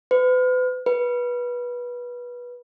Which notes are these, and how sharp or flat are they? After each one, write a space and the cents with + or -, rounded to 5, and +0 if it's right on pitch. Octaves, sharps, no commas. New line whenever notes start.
B4 +40
B4 -20